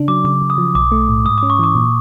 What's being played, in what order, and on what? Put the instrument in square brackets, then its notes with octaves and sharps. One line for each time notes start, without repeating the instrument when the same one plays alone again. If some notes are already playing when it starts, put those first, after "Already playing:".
Already playing: [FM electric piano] C#3 D4
[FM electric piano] F#3 [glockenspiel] D6
[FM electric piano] C#3 [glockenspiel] D6
[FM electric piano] C#3
[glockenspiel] D#6
[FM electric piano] F3
[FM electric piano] B1 [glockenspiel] D6
[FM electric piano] A3
A2
[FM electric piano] G#2 [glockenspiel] D#6
[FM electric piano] C#4 [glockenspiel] D6
[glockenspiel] C#6
[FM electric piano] E3 [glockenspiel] D6
[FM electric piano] A#2